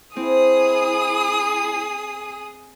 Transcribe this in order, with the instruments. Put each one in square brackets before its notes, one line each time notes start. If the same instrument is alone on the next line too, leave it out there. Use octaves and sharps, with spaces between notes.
[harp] C4 [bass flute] E4 [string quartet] G#4 D#6